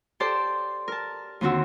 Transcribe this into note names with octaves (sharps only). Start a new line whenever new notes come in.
G4 A4 C5 D5 A5
A#4 A5
D#2 D3 C4 F#4 E6